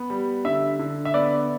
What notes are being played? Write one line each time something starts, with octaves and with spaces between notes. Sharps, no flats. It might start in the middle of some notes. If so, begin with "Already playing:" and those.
Already playing: B3
G3
D3 E5
D3
E5
B3 D5